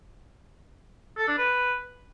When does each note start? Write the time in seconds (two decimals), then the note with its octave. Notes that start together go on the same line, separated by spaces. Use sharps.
1.18 A4
1.28 D4
1.38 B4